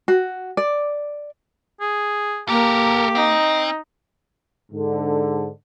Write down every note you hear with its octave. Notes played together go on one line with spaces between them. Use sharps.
F#4
D5
G#4
A#3 G4 A4 A#4
C4 D#4
G#2 D3